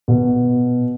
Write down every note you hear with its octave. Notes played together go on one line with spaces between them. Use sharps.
B2